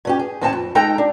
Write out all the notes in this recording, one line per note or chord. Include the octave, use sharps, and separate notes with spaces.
G2 C#4 G4
G#4
D2 A2 C4 C#4 F#5 A5
F2
G#3 D#4 A4 G5 A#5
D4